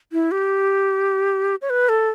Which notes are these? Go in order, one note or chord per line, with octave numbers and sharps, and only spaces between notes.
E4
G4
C#5
B4
A4